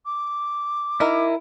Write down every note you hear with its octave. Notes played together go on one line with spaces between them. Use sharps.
D6
D#3 D#4 E4 A#4